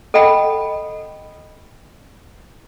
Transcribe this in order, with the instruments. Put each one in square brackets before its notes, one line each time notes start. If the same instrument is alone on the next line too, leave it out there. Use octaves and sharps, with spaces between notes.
[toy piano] A4 D#5 F#5 G5 B5